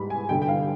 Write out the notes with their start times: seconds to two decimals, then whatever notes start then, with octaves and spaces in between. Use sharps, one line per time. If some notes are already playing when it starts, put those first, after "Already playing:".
Already playing: G#2 G3 B5
0.10 G#5
0.29 G2 D3 G3 G5
0.42 G5
0.48 F5